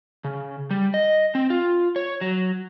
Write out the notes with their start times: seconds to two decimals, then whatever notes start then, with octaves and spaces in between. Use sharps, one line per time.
0.24 C#3
0.71 G3
0.94 D#5
1.35 C4
1.50 F4
1.96 C#5
2.21 F#3